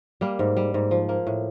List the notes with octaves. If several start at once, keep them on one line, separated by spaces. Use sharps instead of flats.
G3 A#3
G#2
G3
G#2
F3
A#3
A2